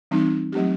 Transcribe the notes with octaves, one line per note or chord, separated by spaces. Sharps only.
E3 G3 C4 D#4
F#3 A3 C4 D#4 G4